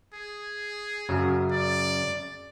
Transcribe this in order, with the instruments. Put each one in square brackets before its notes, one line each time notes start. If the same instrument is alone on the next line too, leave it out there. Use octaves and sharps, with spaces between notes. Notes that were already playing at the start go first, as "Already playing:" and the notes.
[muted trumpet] G#4
[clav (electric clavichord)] F#2 C#3 F#3
[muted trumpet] D5